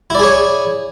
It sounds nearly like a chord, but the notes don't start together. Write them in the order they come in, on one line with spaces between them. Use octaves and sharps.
E4 D5 G#4 C#5